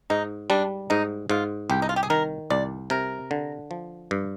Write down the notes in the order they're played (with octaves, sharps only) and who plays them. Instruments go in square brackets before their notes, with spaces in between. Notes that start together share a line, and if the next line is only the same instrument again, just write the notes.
[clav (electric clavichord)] G#2 [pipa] D#4
[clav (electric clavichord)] G3 [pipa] D4
[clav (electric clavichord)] G#2 [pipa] D#4
[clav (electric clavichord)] G#2 [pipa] F4
[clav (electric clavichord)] C2 [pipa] G4
[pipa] D#4
F4
G4
G#4
[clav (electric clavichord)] D#3 [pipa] A#4
[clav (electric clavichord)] C2 [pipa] D5
[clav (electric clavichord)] C3 [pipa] A#4
[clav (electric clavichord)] D3
F3
G2